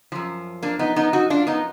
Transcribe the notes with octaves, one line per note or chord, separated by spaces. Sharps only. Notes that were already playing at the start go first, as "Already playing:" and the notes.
F#2 F3
A#3 D4
B3 D#4
B3 D#4
D#4 F#4
D4 F4
B3 D#4